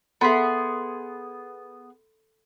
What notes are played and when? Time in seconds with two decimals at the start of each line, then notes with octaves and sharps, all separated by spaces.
0.21 B3 G#4 A4 E5 B5 C6 B6